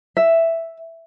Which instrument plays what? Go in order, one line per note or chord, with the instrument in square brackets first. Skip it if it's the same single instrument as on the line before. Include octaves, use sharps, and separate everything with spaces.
[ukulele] E5